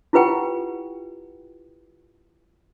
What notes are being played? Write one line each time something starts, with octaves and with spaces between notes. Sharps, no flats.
E4 F4 G4 B4 F#5 G5